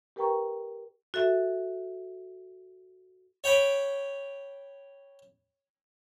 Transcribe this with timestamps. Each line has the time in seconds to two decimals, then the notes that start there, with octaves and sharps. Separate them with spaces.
0.16 G4 A#4 B4 G5 A#5 C#6
1.14 F#4 A4 E5
3.44 C#5 G5 B5 D6